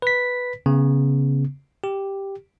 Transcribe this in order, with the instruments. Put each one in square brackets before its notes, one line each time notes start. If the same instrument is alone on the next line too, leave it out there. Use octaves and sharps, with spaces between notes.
[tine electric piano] B4 B6
C#3 B3
G4